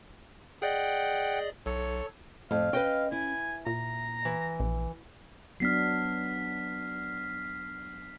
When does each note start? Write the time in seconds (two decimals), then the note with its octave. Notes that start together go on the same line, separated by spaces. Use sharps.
0.62 G#4 D5 D#5 F#5 G5
1.66 B1 A4 C#5
2.51 F2 A2 F5
2.73 C#4 B4 D#5 G5
3.12 E4 G#5
3.66 A#2 A#5
4.25 E3
4.60 A#1
5.60 F#3 B3 D4 F6 B6 C7